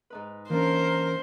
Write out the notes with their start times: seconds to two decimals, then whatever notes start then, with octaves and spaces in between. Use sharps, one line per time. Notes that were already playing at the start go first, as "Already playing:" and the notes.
0.10 G#2 D#4 B4
0.50 E3 A#3 C#4 D4 A#4 C5